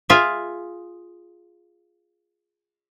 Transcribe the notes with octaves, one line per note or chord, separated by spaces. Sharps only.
F4 G#4 E5